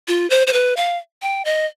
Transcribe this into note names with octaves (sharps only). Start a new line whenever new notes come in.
F4
C5
C5
B4
F5
G5
D#5